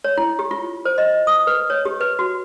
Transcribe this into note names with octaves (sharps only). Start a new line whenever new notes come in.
C#5
E4
G4
F4
C5
D#5
D#6
B4
C#5
G4
B4
F#4